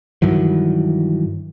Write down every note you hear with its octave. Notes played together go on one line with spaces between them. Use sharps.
G2 D#3 E3 F#3